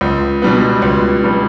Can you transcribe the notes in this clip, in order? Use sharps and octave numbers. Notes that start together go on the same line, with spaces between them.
C#2
B2 G3 B3
C#2
B2 G3 B3